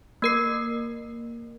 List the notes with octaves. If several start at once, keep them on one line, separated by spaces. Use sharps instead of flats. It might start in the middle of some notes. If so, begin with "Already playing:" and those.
A#3 A#4 C7